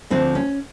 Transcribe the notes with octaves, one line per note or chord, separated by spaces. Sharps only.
D2 D3 F3 C4
C#4